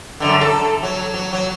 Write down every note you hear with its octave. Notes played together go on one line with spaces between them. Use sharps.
F#2 A#2 D3
A4
F#3
F#3
F#3